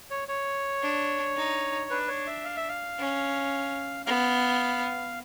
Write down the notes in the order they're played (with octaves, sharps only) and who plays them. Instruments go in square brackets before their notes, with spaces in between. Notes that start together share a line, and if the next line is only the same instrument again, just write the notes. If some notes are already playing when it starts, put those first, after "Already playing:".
[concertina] C#5
C#5
[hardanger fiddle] D4
D#4
[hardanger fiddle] D4 [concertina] B4
[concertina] C#5
E5
F5
E5
F5
[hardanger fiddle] C#4
[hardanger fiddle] B3 [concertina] F5